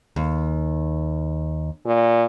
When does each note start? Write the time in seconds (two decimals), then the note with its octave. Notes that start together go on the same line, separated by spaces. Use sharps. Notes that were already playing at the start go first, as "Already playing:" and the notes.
0.16 D#2
1.86 A#2